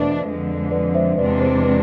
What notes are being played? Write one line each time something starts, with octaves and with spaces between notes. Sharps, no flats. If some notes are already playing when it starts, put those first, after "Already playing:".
Already playing: E2 B2 A3 D4 B4 C5 D5 E5
F2 D3 F3 G#3
B4 D5
C5 E5
E2 C3 G#3 D4 B4 D5
C5
B4